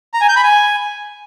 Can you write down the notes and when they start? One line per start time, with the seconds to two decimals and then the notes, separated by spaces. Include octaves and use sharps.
0.14 A#5
0.21 G#5
0.29 G6
0.36 B5
0.43 G#5